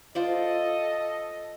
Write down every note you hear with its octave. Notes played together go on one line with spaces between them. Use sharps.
F4 A4 C5 D5 D#5